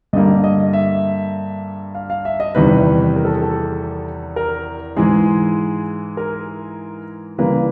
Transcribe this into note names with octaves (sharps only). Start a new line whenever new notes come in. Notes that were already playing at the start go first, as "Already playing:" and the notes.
G2 D3 G3 A#3 D#5
D#5
E5
F5
F5
E5
D#5
E2 C3 D#3 G3 B4
A#4
A4
G#4
A4
A#4
G#2 E3 G#3 G#4
A#4
C#3 E3 G3 A#3 B4